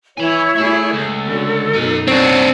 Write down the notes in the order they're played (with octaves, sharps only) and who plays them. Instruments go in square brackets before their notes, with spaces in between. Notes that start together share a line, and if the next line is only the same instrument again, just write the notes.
[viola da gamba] E3 [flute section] E4 C#5 [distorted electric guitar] G#5 B5
[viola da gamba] A3 G#4 [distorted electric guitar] E5 B5
[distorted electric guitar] C#2 [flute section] A4
[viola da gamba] D3 C#4 F#4
[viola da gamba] F#2 B2 D#4 [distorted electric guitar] A#4 G#5
[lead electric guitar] C4 D4 [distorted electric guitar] C#5 F#5